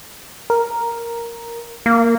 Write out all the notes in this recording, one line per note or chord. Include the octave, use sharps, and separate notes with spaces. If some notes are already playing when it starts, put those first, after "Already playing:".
A#4
A#3